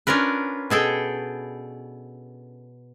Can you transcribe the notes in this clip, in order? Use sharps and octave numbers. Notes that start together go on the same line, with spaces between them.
C#4 D4 F4 A#4 B4
B2 G#4 A4 G5